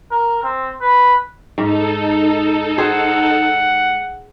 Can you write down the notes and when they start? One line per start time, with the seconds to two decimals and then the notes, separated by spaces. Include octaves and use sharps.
0.11 A#4
0.43 C4
0.81 B4
1.58 G#2 D#4 A4
2.78 G#4 C5 F#5